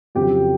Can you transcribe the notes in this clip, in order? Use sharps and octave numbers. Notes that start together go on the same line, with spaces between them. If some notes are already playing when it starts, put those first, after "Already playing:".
F2 C#3 F#3 G4 G5